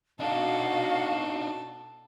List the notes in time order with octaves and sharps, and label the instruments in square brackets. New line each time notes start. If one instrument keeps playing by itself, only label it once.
[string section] B2 F#4 [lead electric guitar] D4 D#4 [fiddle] A4 [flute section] F5